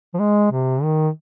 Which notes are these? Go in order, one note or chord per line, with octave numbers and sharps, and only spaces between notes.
F3
G#3
C3
D#3